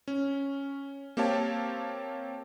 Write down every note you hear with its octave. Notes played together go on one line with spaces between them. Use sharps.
C#4
A#3 C4 G4 C#5 F5 A5